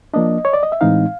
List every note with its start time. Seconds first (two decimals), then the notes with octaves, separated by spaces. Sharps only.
0.14 F3 A#3 D4 D#5
0.45 C#5
0.53 D5
0.63 D#5
0.72 E5
0.81 A2 E3 G#3 C4 D#4 F5